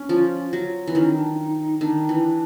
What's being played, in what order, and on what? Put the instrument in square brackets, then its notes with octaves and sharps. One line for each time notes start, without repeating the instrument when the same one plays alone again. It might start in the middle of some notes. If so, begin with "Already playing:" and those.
Already playing: [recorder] C#4
[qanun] F3
F#3
E3
[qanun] D#3 [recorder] C#4
[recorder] D4
D#4
D#4
[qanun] D#3 [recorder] D4
[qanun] E3